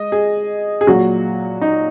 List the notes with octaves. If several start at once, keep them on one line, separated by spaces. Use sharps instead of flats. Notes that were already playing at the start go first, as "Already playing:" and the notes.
Already playing: G#3 D#5
G#4
G#4
A#2 F#3 F#4
D#4